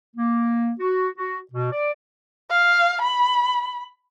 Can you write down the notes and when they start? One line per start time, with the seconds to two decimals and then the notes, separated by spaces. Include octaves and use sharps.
0.15 A#3
0.79 F#4
1.16 F#4
1.52 B2
1.71 D5
2.51 F5
3.02 B5